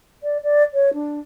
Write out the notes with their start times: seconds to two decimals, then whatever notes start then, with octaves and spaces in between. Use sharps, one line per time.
0.23 D5
0.43 D5
0.74 C#5
0.94 D4